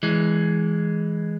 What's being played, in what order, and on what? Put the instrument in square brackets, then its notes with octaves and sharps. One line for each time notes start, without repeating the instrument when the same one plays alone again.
[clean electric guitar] E3 G#3